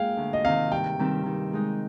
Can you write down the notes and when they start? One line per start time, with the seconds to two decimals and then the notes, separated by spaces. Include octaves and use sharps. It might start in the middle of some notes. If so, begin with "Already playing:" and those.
Already playing: G#3 A#3 G#4 F5 G5
0.17 D2
0.33 D#5
0.44 C3 D#3 F5
0.72 G2 G5
0.99 D#3 G3 C4 G4
1.26 D#3
1.53 G#3 D#4